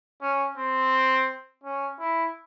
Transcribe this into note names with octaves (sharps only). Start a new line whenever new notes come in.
C#4
C4
C#4
E4